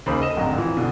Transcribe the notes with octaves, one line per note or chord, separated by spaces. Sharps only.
D#2 C#3 D#4 C5 B5
A4 D#5 E7
D1 G#1 F2 D3 A#5
E3 F3
G1 B2 D3